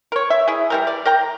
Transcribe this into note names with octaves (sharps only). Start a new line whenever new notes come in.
A#4 C#5
E5
E4 G#4
E3 G3 A#4
D5
A#4 G5 A#5